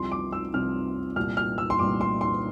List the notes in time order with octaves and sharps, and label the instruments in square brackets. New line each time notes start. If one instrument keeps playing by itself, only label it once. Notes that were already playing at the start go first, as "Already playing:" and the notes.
Already playing: [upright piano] C2 C3 F3 C6
D6
E6
C2 C3 F3 F6
C2 A#2 G3 F6
F6
E6
C6
C2 A#2 G3 D6
C6
C6